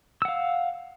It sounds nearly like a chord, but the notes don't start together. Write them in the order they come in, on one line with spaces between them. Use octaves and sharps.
E6 F#5 F5